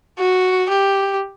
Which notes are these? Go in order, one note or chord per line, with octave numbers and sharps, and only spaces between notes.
F#4
G4